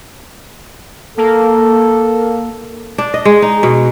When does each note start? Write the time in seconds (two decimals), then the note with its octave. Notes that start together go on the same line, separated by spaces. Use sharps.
1.17 A#3 A4
2.98 D4
3.14 D#5
3.25 G#3
3.42 D#4
3.63 B2